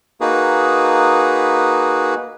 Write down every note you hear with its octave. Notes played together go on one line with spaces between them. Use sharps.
A#3 D#4 F#4 G#4 B4